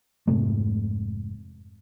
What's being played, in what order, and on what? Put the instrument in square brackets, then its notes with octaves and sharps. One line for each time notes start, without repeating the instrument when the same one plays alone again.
[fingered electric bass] F1 G#2 C3 A3